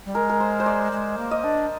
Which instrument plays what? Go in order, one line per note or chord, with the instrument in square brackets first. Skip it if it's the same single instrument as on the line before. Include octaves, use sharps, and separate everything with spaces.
[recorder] G3
[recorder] G#3 [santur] A#4
[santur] A#4
C5
C5
D5
[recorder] G#3
A#3
[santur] D#5
[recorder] D4